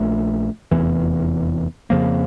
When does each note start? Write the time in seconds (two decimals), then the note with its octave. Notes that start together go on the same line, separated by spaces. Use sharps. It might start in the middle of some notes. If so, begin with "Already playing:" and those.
Already playing: A#1 A#2 A3
0.71 F1 E2 E3
1.90 F2 C#3 F3 A#3